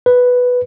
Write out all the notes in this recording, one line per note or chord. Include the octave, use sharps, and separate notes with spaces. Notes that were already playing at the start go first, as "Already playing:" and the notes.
B4